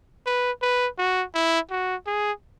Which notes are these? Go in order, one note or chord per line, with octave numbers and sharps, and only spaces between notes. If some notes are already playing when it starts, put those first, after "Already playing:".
B4
B4
F#4
E4
F#4
G#4